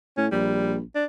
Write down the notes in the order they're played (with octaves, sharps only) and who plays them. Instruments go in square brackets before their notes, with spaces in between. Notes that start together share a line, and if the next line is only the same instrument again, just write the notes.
[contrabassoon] A2 [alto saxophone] C#4
[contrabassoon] A#1 [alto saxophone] G3
[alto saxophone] D4